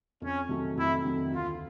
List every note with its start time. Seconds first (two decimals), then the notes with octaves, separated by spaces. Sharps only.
0.22 F2 C#4
0.49 C3 D#3 F#3 A3
0.76 F2 E4
1.04 C3 D#3 F#3 A3
1.32 D2 F4